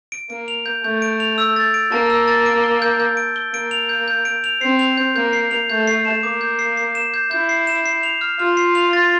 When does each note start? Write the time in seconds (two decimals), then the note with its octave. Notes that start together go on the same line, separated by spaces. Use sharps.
0.12 D7
0.30 A#3 D7
0.48 F7
0.66 G6
0.84 A3 G6
1.02 D7
1.20 F7
1.38 E6
1.56 A6
1.74 D7
1.92 A#3 A5
2.10 E6
2.27 A6
2.46 D7
2.64 G7
2.82 G6
3.00 G6
3.17 D7
3.36 G7
3.54 A#3 D7
3.71 F7
3.89 G6
4.08 G6
4.25 D7
4.44 F7
4.61 C4 C7
4.79 F7
4.97 G6
5.15 A#3 G6
5.33 C7
5.51 F7
5.69 A3 G6
5.87 C7
6.05 E7
6.23 A#3 D6
6.41 G6
6.59 C7
6.77 C7
6.95 E7
7.14 G6
7.31 E4 G6
7.49 C7
7.67 E7
7.86 C7
8.03 F7
8.21 F6
8.39 F4 F6
8.57 C7
8.75 F7
8.93 A6